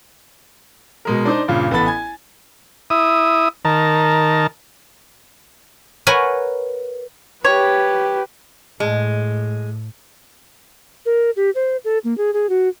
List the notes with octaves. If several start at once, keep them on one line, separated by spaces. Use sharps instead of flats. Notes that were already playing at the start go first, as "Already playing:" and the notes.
B2 G#3 A#4
D4 D#4 C5
G2 A#2 C#3
A1 B3 A4 B5 A6
G#5 G#6
E4 D#6
D#3 A#4 A5
A#4 B4 C#5 F#5 G#5
G4 B4 C#5
A2 G#3
A#4
G4
C5
A4
A#3
G#4
G#4
F#4